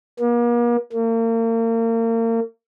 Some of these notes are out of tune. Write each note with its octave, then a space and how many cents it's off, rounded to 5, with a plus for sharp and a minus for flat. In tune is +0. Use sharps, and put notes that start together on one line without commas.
A#3 +40
A#3 -35